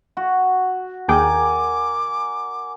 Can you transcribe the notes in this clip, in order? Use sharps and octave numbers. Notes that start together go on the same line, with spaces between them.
F#4
D#2 G#4 A#4 D5 G5 G#5 D6